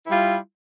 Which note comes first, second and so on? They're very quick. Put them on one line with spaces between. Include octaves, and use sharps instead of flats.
E4 G3 F4